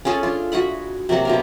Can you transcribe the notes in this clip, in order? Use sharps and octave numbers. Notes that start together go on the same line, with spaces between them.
C#4 F4 G#4 A4
D4 F4
F#4 G#4 F#5 B5
C3 F#3 A#3 F#5
B2 D3 A#4